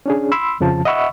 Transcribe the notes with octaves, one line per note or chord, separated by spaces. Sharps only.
C#4 D4 G#4
B5 C6 E6
F2 C#3 F3 A5
D#5 E5 F#5 B5 C#6 E6